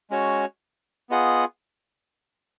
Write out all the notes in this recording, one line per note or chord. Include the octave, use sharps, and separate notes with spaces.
G#3 C#4 F#4 C#5
B3 F4 G#4 D#5 F#5